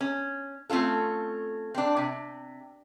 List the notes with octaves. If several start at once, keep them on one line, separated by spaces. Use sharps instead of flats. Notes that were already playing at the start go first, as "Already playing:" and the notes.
C#4
A3 C4 C#4 F4 A4
C4 D4
C3